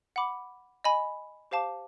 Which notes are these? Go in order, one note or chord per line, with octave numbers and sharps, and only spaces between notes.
F#5 B5 D6
D#5 G#5 B5
G4 C5 F5 A5 D6